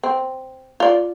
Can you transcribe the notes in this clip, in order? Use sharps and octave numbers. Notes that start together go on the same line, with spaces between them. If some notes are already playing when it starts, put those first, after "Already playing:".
C4
F4 D5